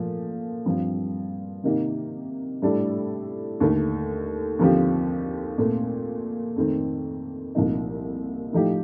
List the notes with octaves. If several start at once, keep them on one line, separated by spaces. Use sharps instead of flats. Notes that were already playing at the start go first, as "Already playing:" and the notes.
Already playing: A#2 F3 A3
G2 F3 C4
C3 D#3 A#3 D#4 G4
A2 G3 D4 A4
D#2 D3 A3
D#2 D3 F3 C4 G4
A#2 A3 C4
F2 D#3 A3 C4
C2 A#2 F3 A3 D#4
A2 F3 A3 D#4 G4